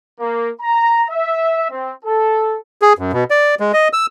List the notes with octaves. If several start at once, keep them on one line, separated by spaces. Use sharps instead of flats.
A#3
A#5
E5
C4
A4
G#4
F#2
B2
D5
G#3
D#5
E6